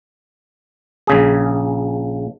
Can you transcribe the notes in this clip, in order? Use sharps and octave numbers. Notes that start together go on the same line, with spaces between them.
A#1 C#3 G#4